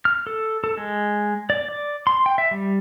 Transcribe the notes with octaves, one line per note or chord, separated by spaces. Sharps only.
F6
A4
A4
G#3
D5
D5
C6
G5
E5
G3